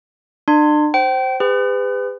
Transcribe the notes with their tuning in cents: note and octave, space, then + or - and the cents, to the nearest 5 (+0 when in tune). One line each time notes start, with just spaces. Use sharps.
D4 +40 C6 +0
C5 +0 G5 -30
G#4 -45 B4 +35